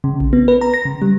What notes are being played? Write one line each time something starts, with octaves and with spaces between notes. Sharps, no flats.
C#3
A#1
B3
B4
A#5
A#6
C#3
G3